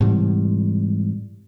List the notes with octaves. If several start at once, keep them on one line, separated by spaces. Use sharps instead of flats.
G#2 C3 E3 G3